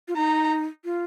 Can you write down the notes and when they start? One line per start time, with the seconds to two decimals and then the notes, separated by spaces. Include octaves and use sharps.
0.08 F4
0.16 D#4 A#5
0.85 F4